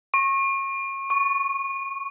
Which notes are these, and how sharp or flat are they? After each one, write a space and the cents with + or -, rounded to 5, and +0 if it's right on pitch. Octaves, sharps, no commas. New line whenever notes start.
C#6 -30
C#6 +0